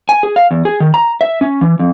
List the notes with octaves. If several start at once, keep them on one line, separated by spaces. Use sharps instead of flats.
G#5
G#4
F5
E2
G#4
D#3
A#5
E5
C#4
E3
F2